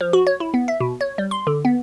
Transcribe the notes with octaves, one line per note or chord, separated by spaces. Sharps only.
F3
F#4
C#5
E4
B3
E5
B2
C#5
G3
C6
D3
B3